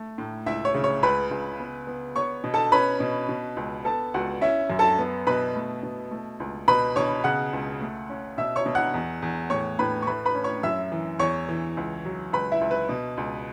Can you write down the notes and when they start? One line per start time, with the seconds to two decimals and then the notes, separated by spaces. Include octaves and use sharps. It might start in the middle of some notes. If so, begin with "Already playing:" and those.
Already playing: A3
0.18 A2
0.46 C#2 E4 E5
0.65 C#5
0.74 C#3
0.84 C#5
1.03 C#2 B4 B5
1.31 C#2
1.60 B3
1.87 B3
2.16 B3 C#5 C#6
2.44 B2
2.54 A4 A5
2.72 C#4 B4 B5
3.00 B2
3.29 B2
3.57 C#2
3.85 B3 A4 A5
4.14 C#2 F#4 F#5
4.41 C#4 E4 E5
4.70 F#2
4.79 A4 A5
4.98 B3
5.27 B2 B4 B5
5.55 A3
5.83 B2
6.11 A3
6.40 C#2
6.68 B2 B4 B5
6.96 B2 C#5 C#6
7.24 C#3 F#5 F#6
7.53 C#2
7.81 A3
8.10 C#4
8.38 B2 E5 E6
8.56 C#5 C#6
8.66 B2
8.75 F#5 F#6
8.94 E2
9.22 E2
9.50 A2 C#5 C#6
9.79 A2 B4 B5
10.02 C#6
10.07 A3 B4 B5
10.25 B4 B5
10.35 C#4
10.44 C#5 C#6
10.63 F#2 E5 E6
10.92 E3
11.19 E2 C#5 C#6
11.49 E3
11.77 C#2
12.05 F#3
12.33 C#2 B4 B5
12.52 E4 E5
12.61 C#2
12.71 B4
12.89 B2
13.17 C#2